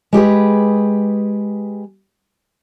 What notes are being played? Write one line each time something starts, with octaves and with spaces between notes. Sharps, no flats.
G#3 G4 G#4 B4